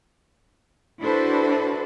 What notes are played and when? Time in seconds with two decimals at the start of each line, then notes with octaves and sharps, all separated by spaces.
1.00 D4 E4 F#4 A4 B4 C5